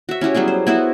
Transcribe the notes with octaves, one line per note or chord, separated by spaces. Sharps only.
F#4 E5
C#4 E4 F#4 G4
F#3 G3 B3 G#4
C5
B3 E4 F#4 C5